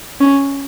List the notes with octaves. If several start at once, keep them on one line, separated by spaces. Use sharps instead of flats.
C#4